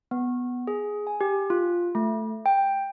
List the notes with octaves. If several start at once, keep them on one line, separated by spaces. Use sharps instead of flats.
B3
G#4
G#5
G4
F4
A3
G5